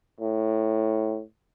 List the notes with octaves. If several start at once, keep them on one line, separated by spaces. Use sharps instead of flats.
A2